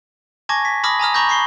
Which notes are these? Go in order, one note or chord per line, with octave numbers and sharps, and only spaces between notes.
G#5 A5 C#6 D6 G#6 A#6
B6
A5 B5 D6 D#6 F6 A#6
G#5 A#5 D#6 F6
A#5 B5 C#6 F6 G6 A#6
B5 C#6 C7 G7